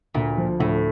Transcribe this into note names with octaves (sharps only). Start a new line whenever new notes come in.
D2 A#2
F3
D2 A2